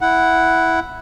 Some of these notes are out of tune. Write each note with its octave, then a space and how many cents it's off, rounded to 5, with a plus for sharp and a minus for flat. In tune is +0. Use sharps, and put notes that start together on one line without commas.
E4 +0 F#5 +0